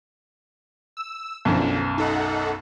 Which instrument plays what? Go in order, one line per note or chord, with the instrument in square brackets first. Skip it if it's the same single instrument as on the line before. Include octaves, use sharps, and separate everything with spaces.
[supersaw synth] E6
[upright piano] B1 F#2 [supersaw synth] D3 F3
[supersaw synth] D#4 A4 F#5